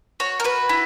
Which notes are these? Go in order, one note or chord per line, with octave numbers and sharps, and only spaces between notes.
F#4 C#5
A#4
F#4 B4
E4